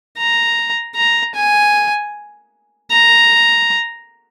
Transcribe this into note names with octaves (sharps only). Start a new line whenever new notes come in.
A#5
A#5
G#5
A#5